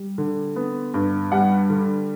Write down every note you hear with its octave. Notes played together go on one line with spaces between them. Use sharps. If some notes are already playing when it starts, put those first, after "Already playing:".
Already playing: G3
D3
B3
G2
G3 F#5
D3